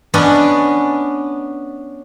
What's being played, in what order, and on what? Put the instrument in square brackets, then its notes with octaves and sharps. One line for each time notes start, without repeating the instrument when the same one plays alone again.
[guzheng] B3 C#4 D4 D5 D#5